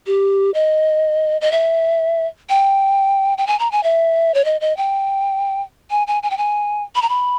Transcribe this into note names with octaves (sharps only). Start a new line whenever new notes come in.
G4
D#5
D#5
E5
G5
G5
G#5
A#5
G#5
E5
C#5
D#5
D#5
G5
G#5
G#5
G#5
G5
G#5
B5
A#5
B5